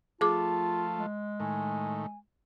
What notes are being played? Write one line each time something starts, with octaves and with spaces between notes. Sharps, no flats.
F3 A3 F4 G#4 A5 D6
G#3
A2 D#3 G#5